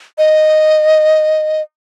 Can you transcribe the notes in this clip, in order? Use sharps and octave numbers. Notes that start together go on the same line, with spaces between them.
D#5